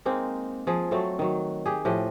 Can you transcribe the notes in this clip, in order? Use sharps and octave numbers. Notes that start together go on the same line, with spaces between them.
G#3 A#3 C4 D#4
F3 G#4
F#3 A3 C4 A4
D#3 F#3
G4 G#4
A2 F3 G4 D#5